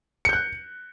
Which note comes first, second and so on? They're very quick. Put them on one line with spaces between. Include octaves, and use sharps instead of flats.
C#7 G6 F#6